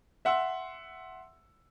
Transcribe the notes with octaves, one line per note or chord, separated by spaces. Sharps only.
E5 F#5 C6 E6